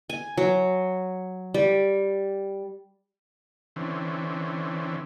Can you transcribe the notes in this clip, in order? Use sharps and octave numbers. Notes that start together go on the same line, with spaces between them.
G#5
F#3
G3
D3 E3 C4 C#4